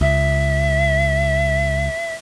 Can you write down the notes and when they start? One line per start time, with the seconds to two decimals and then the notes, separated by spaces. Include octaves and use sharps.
0.01 C#2 E5